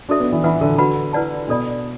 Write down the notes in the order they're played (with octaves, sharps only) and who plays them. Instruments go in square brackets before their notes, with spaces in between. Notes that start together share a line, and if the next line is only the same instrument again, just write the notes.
[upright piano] D4 [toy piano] F#4 A4 E5
[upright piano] B3
E3
[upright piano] E3 [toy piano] B4 F#5 B5
[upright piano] D3
[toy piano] D4 F#4 B4 F#5 B5
E4 B4 D5 F#5 A5
[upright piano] B2 [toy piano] D4 A4 D5 B5